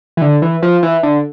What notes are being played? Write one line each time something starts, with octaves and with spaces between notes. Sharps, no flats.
E3
D3
E3
F3
E3
D3